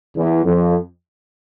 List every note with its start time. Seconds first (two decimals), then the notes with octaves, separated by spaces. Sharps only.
0.15 E2
0.44 F2